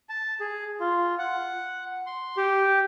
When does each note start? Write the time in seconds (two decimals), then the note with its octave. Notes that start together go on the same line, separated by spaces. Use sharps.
0.09 A5
0.40 G#4
0.80 F4
1.19 F#5
2.06 C6
2.37 G4